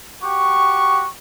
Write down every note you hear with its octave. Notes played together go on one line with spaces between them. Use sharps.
F#4 G4 C#6